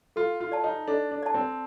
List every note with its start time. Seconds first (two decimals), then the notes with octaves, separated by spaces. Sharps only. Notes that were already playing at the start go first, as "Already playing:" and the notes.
0.16 F4 A4
0.40 F4
0.52 D5 A5
0.64 D#4
0.88 D4 A4
1.11 D4
1.23 D5 A5
1.34 C4